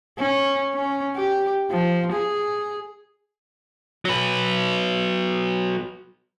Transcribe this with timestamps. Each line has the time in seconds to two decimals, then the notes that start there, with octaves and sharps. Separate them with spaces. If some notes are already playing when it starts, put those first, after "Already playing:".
0.18 C#4
0.74 C#4
1.16 G4
1.71 F3
2.12 G#4
4.05 F#3 B4